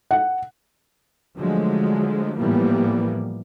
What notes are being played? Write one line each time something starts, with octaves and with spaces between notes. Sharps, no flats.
F#5
D3 F3 F#3 G#3 A3
A2 E3 F3 G3 A#3 B3